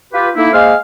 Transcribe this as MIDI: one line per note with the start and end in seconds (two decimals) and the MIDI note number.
0.13 0.30 65
0.13 0.30 67
0.13 0.30 71
0.36 0.51 57
0.36 0.51 58
0.36 0.51 63
0.36 0.51 64
0.53 0.75 56
0.53 0.75 58
0.53 0.75 72
0.53 0.75 77